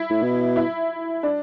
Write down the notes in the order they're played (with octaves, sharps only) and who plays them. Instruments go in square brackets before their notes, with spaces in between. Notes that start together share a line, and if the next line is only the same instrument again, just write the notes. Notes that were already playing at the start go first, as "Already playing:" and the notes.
Already playing: [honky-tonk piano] E4
[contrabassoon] A2
B2
[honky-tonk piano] E4
D4